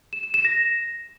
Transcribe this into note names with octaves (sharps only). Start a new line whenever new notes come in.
E7
E7
E7
A#6